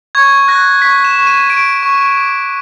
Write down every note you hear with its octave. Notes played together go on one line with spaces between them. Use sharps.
C#6 G#6
F#6 A#6
C#6 B6
E7
C#6
D#7
C#6 D7
C#6
D6